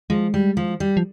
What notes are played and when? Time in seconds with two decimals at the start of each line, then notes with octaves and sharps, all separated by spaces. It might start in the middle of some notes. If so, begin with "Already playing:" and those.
0.10 F3 G#3
0.34 G3
0.57 F3
0.80 G3
0.97 F3